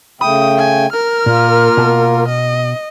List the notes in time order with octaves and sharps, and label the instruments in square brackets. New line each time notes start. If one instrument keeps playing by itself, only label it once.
[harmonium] C#3 A3 G5 [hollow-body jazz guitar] B5 [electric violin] D#6
[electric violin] G#5
A#4 F6
[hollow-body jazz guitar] A#2 [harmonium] A#3 F4
[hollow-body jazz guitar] B2 A5
[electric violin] D#5